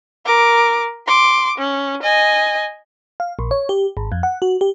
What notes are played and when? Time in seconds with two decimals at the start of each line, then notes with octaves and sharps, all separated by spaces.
0.25 A#4 D6
1.07 C6 D6
1.58 C#4
2.03 D#5 G#5
3.20 F5
3.39 A#1
3.51 C#5
3.69 G4
3.97 G#1
4.12 F2
4.23 F#5
4.42 F#4
4.61 G4